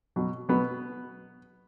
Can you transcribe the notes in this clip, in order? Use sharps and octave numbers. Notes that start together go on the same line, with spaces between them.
B2 F#3
B2 F#3 B3